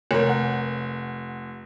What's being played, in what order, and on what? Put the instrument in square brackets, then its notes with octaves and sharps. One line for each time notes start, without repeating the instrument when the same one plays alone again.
[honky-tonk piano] F1 [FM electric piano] A#4 C#5
[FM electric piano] F#5